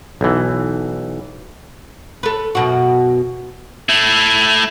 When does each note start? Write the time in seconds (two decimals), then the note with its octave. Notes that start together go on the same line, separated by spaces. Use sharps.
0.21 B1 E3
2.23 A4 B4
2.55 F#2 B2 F#4
3.89 A3 E4